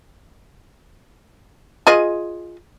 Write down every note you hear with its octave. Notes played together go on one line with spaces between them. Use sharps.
F4 G#4 D#5